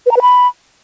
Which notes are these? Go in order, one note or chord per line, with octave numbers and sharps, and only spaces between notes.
B4
A#5
B4
B5